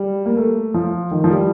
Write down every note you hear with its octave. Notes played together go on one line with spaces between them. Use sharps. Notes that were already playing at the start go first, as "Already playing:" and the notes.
Already playing: G3
A#3
A3
F3
D#3
F3
G3